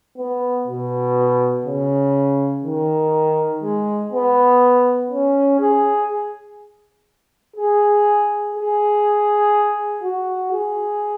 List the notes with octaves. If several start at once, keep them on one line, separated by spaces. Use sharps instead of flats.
B3
B2
C#3
D#3
G#3
B3
C#4
G#4
G#4
G#4
F#4
G#4